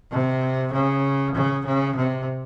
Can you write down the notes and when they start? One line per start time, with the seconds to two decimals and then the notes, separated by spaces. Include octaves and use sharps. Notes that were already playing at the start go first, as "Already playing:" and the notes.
0.11 C3
0.73 C#3
1.35 C#3
1.66 C#3
1.96 C3